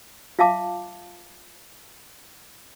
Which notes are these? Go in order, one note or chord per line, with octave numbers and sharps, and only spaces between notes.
F4 E5 F5 A5 D6